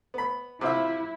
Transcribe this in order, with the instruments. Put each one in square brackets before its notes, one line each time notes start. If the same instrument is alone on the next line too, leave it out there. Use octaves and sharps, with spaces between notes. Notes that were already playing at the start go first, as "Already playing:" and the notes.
[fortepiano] B3 B5
[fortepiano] C3 F4 E5 [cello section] E4